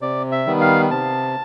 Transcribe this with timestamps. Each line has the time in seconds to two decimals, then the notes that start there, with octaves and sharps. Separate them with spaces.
0.01 C3 D5
0.32 E5
0.46 D#3 G3 B3
0.61 F5
0.91 C3 A5